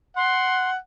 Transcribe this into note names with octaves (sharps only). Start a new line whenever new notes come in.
F#5 C6